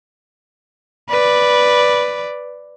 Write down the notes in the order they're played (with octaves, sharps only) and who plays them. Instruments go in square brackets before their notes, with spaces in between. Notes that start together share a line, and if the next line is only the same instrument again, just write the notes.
[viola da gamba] B4 D5